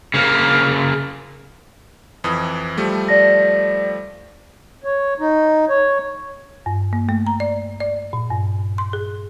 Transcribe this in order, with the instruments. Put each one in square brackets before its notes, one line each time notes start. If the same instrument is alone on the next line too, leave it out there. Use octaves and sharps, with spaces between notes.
[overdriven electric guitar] C#3 A#3
[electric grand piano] F2 E3 D#6
F3 G3 A3
[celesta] D5 A#6
[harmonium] C#5
D#4
C#5
[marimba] G2
A#3
A3
A#5
D5
D5
A#2
G2
C6
G#4